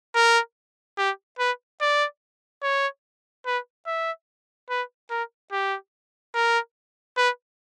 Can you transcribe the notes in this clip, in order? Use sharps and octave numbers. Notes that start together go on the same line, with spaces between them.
A#4
G4
B4
D5
C#5
B4
E5
B4
A#4
G4
A#4
B4